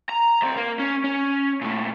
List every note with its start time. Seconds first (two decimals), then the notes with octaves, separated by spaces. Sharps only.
0.09 A#5
0.41 D2 C4
0.57 A#3
0.79 C#4
1.04 C#4
1.61 A#2 A3